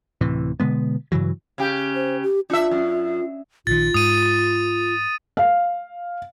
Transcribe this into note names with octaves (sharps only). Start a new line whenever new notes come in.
D1 A2 C3 E3
B2 D3 G#3 B3
G2 C#3 E3 F#3
C#3 G4
C5
G4
D4 F4 E5
F#2
A#1 D#3 F4 A6
G#2 D#6 D#7
F5